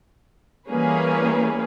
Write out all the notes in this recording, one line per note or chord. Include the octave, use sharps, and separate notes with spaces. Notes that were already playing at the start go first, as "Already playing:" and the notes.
E3 G3 A#3 C#4 G#4 B4